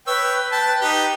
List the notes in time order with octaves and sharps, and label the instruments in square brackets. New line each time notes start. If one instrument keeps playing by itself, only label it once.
[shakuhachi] B4 [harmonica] C#5 G5 E6
[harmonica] G5 A5
D#4 G4